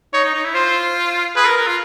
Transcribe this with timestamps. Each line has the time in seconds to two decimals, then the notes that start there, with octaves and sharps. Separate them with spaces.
0.13 D#4 C#5
0.24 D#4
0.34 D#4
0.44 E4
0.54 F4 C5
1.36 G#4 B4
1.46 A#4
1.57 A#4
1.67 F4